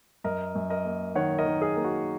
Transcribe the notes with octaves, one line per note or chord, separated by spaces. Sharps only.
F#2 A#4 D#5
F#2
A#4 D#5
A#3
D#3 C#5 F#5
A#4 D#5
D#3
G#4
A#3
F#4